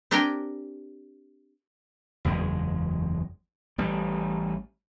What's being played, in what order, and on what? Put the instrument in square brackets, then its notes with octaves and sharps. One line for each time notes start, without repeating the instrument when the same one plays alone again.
[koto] C4 D4 G4 A#4 G5 G#5
[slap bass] F#1 E2 G#3
A1 G3